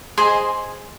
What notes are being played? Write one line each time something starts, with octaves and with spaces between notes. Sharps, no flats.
G#4 C5 D#5 G#5 C6